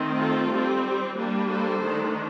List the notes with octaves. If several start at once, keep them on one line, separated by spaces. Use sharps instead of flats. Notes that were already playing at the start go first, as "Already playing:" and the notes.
Already playing: D#3 A3 C4
F4 A4
G3 C4
G3 A#3 D4
A4 C5
D#3 A3 D4